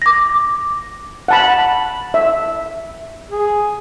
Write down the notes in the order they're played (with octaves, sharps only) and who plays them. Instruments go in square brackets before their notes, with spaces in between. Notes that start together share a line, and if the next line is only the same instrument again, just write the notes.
[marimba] D6 A#6
[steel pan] F#5 A5 B5
E5
[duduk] G#4